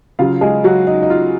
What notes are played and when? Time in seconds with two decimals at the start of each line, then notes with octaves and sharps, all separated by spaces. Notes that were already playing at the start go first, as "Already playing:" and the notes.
0.19 C#3 F#3 F4 F5
0.41 G#3 G#4
0.64 F#3 F#4
0.87 D#4
1.02 D#4
1.10 F4